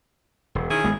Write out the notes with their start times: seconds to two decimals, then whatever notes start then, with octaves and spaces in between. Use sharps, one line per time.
0.55 E1
0.71 D#3 C#4 E4 G#4
0.84 G#1 G#3 B3